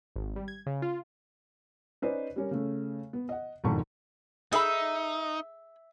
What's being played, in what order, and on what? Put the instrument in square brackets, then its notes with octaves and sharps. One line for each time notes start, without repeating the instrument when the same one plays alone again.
[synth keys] G#1
G3
G#6
C#3
F4
[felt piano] C#4 D#4 B4 C5 D5 D#5
G3 C#4 A#4
C#3 A3
B3
D#5 F#5
E1 B1 F2 G#2 D#3 C#6
[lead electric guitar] D#4 [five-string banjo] G#4 A4 B5 [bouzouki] E5